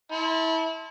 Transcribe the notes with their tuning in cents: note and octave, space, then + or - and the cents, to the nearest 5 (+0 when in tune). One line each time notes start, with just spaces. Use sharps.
E4 -25 A5 +0 C6 +0